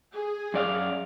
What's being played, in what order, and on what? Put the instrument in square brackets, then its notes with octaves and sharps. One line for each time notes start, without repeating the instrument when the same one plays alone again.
[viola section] G#4
[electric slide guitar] F#2 D5 F5